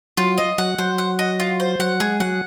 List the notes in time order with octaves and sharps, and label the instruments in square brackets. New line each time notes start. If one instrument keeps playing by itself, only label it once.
[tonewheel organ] F#3 [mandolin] F4
[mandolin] D#5
[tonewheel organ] F#3 [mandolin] F#5
[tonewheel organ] F#3 [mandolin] C5
[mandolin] F#5
D#5
F4
C5
[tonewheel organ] F#3 [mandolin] F#5
[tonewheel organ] G#3 [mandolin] G#4
[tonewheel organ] F#3 [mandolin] F#5